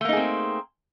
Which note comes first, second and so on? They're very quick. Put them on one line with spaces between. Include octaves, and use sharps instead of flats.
A3 A#3 D#4 G#4 C4